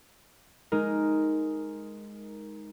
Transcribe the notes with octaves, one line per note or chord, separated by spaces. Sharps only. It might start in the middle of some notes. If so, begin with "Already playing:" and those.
G#3 D#4 A#4